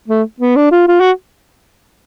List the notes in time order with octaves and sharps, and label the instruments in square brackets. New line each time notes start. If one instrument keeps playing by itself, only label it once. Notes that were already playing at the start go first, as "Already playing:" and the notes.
[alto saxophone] A3
B3
D4
F4
F4
F#4